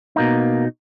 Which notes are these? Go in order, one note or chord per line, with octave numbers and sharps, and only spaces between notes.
B2 A#3 D#4